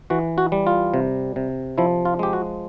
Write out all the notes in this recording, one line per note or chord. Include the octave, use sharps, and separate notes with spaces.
E3 F#4
F#4
G3
F4
C3
C3
F3 E4
F4
G#3 G4
F#4